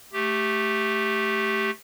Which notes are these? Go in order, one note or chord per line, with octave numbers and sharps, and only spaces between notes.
A3 G4